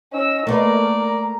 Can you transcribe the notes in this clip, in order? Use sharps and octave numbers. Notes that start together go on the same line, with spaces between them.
C#4 D#5 E6
A3 A#3 A#4 B4 D5
A#5